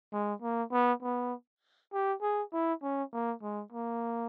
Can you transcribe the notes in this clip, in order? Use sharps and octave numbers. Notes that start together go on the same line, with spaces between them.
G#3
A#3
B3
B3
G4
G#4
E4
C#4
A#3
G#3
A#3